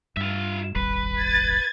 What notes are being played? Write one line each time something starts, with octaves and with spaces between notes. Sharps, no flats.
G2 F4 E5
D#1 G#1 G3 B4
G#6 A6